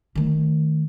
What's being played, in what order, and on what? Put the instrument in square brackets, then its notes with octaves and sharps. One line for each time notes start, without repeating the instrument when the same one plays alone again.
[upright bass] D#3 A3